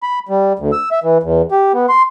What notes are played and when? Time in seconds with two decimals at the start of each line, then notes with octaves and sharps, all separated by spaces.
0.03 B5
0.29 G3
0.59 D2
0.73 E6
0.92 E5
1.04 E3
1.23 E2
1.52 G4
1.73 B3
1.89 C6